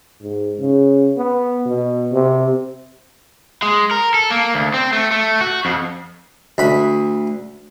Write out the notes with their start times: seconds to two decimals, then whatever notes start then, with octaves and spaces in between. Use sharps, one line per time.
0.23 G#2
0.59 C#3
1.17 B3
1.66 B2
2.12 C3
3.62 G#3
3.91 A#4
4.14 A4
4.30 A#3
4.54 D2
4.74 C4
4.93 A3
5.11 A3
5.41 F#4
5.65 F2
6.58 D2 B5